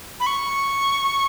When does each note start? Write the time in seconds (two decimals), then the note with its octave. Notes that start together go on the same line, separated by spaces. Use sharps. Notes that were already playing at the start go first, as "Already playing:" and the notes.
0.20 B5
0.26 C#6